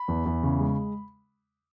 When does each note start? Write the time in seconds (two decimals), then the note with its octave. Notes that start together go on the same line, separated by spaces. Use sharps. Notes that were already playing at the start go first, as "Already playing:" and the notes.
Already playing: B5
0.08 E2
0.25 E2
0.43 C#3
0.60 G#3